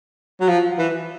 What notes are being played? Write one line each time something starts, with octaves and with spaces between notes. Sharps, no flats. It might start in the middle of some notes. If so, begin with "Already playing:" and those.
F#3
F3
E3